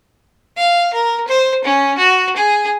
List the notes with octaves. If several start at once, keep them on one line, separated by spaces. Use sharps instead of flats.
F5
A#4
C5
C#4
F#4
G#4